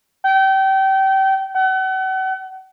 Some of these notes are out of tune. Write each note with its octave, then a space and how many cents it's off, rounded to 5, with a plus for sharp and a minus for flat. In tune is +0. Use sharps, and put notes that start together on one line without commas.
G5 -30
F#5 +40